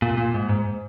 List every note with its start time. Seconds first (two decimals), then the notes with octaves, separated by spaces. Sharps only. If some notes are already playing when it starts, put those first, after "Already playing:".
0.02 A#2
0.17 A#2
0.34 G#2
0.49 G#2